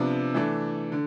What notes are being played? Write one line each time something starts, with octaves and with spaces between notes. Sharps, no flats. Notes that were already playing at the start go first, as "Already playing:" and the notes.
Already playing: C3 F3 B3 D4
E3 A3 D4
D3